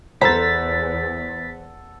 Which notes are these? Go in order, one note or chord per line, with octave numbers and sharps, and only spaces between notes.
E2 A4 C5 F#5 A#5 A6 B6